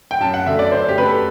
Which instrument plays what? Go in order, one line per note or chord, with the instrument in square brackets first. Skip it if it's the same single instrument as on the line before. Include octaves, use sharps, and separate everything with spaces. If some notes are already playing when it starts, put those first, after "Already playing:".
[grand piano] G5
F#2 A5
F#5
D3 F#3 A3 E5
D5
F#2 C5
G4
D3 F#3 A3 B4
A4